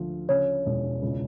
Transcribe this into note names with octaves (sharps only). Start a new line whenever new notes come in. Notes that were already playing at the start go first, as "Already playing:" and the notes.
Already playing: D2 F3
C#3 C#5
E1
C#2